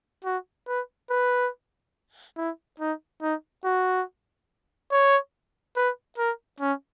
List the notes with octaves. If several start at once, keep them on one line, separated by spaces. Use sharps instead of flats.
F#4
B4
B4
E4
D#4
D#4
F#4
C#5
B4
A#4
C#4